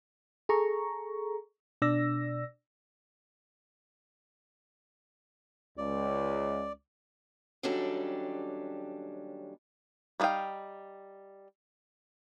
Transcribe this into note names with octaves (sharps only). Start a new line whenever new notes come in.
G#4 A4 A#5 C#6
B2 D4 D5 E6 A#6
C#2 D5
D#2 F#3 G3 C#4 D4 A4
G3 B3 D#4 F5 G5